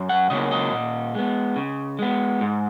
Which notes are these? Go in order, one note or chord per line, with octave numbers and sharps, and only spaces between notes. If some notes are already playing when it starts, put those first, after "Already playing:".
Already playing: F#2
F#5
C#3 F#3 A#3 D#5
D#5
A#2
G#3 B3
C#3
G#3 B3
G#2